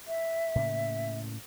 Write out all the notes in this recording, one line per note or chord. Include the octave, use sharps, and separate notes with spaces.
E5
A2 C#3 A#3